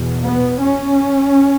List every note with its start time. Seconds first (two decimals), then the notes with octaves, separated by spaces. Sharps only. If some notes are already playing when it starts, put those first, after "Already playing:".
Already playing: E2 B2
0.24 B3
0.60 C#4